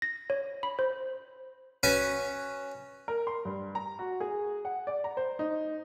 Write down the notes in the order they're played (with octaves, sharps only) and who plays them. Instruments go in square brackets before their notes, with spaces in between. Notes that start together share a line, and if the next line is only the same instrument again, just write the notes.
[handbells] A#6
C#5
B5
C5
[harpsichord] C#4 F#4 B4 F#5 G#5
[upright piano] A#4
C6
G2
A#5
F#4
G#4
F#5
D5
A#5
C5
D#4